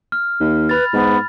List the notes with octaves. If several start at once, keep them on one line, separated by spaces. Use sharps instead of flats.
F6
D#2
B4 B5 A6
G#2 B3